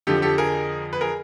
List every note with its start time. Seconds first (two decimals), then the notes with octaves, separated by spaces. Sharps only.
0.07 F2 D3 F3 G4 A4
0.22 G4 A4
0.38 G#4 A#4
0.93 B4
1.01 G#4 A#4